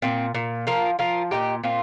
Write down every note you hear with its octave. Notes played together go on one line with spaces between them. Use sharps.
A#2 C4
A#2
F3 F4 A#4
F3 F4 A#4
A#2 D#4 G4
A#2 C4 F4